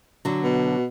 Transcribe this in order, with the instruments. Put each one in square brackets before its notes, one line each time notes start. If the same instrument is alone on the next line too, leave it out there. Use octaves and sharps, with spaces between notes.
[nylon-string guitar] D3 F#3
[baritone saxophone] B2